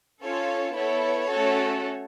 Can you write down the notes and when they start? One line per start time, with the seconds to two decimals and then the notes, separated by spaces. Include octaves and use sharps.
0.22 C#4 F4 A4 C#5
0.76 B3 E4 A4 C#5
1.30 A3 C#4 F#4 A4